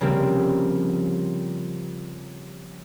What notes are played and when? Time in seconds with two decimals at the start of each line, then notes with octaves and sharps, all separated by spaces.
0.01 C#3 F3 G3 A#3 C4